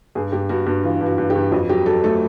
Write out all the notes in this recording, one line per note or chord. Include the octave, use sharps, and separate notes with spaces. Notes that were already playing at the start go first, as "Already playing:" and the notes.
G2 G#4
G2 G4
G2 F#4
G2 F#4
E3 F4
G2
F#4
G2
G4
G2
F2 F#4
F#3 G4
F#3 A4
A3 A4